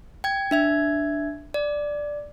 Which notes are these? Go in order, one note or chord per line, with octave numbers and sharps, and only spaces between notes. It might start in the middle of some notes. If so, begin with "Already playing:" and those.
G5 G#6
D4 E5 G#6
D5